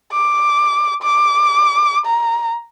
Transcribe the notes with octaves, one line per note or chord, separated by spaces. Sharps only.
D6
D6
A#5